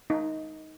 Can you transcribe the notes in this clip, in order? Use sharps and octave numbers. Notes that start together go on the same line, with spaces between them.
D#4